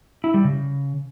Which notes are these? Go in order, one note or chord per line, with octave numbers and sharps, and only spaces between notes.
E4
G3
C#3